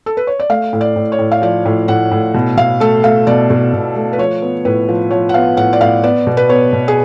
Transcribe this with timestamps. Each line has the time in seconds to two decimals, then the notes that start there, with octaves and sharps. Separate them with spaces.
0.06 A4
0.17 B4
0.27 C#5
0.40 D5
0.49 A3 F5
0.73 A2
0.81 D5
0.96 A2
1.12 C#5
1.19 A2
1.32 F5
1.42 F3 D5
1.65 A2
1.88 A2 F#5
2.11 A2
2.34 B2
2.57 B2 F5
2.80 A3 A4
3.03 A3 F5
3.27 B2 D5
3.50 B2
3.73 B2
3.96 A3
4.13 B4
4.18 F3 C#5
4.42 B3
4.65 A2 B4
4.89 F3
5.11 F3 C#5
5.29 F#5
5.34 B3 F5
5.57 A2 F#5
5.73 D5
5.81 A2 F5
6.03 B3 D5
6.27 B2
6.37 B4
6.49 B3 C#5
6.73 B2
6.88 G#4